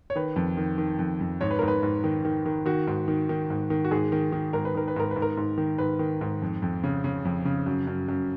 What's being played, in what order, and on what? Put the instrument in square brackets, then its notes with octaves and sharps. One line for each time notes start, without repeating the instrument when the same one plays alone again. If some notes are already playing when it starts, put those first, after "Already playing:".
[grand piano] C#5
D#3 B4
F2
D#3
D#3
F2
F2
G#2 C#5
B4
G#2 A#4
B4
G#2
D#3
D#3
D#3
D#3 F#4
G#2
D#3
D#3
G#2
D#3
F#4
G#2 G#4
D#3
D#3
G#2 A#4
B4
D#3 A#4
B4
G#2 A#4
G#2 B4
A#4
G#2
D#3
G#2 B4
D#3
G#2
F2
F2
C#3
C#3
F2
C#3
F#2
F#2
F#2